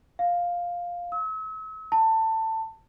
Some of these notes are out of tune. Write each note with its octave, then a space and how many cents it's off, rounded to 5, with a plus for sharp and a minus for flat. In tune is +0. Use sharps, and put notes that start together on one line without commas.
F5 +5
E6 -40
A5 +20